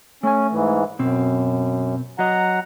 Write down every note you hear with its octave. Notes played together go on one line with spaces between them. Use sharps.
A3 C#4 G#5
G#2 E3
F#2 B2 C4
F#3 D#5 F#5 A#5